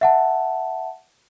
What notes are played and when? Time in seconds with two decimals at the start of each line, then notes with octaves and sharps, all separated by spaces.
0.01 E5 F#5 A5